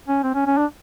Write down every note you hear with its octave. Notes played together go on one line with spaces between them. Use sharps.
C#4
C4
C#4
C#4
D4